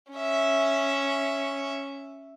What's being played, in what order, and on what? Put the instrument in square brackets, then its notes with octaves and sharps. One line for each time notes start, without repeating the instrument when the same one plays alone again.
[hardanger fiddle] C#4 E5